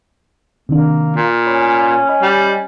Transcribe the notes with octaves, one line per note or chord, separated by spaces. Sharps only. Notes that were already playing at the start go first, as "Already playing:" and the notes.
C3 D#3 A#3 D4
A#2
C#4 C#5 B5
D#5 B5 F6
G3